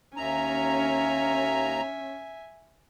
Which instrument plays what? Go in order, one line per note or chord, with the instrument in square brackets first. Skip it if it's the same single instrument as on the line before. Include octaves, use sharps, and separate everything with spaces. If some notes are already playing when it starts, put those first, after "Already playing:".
[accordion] D#2 A#5 [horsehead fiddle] C#4 [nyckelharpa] E5 G#5